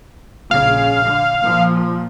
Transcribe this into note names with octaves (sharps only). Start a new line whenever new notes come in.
A#1 C#3 F5
D3
A#2 F3